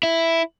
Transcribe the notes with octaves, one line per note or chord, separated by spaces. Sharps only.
E4